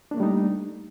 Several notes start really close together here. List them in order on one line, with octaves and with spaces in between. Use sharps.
D4 A#3 A3 G3 D#4